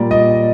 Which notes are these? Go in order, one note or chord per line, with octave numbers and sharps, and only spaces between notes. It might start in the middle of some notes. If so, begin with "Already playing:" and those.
Already playing: A#2 G3 A#3 D5
D#5